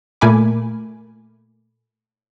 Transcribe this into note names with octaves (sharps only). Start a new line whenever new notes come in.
A#2 A3 A#4 G#5 B5 D6